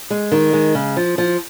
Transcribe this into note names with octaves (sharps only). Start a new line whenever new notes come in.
G#3
D#3
G#3
C#3
F3
F3